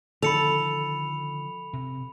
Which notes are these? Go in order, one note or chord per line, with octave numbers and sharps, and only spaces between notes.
D3 D#3 F3 A4 B5 C#7 F7
C3